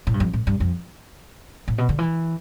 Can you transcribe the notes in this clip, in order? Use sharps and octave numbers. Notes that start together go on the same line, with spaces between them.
A2
G2
F2
A2
G2
F2
A2
B2
D3
E3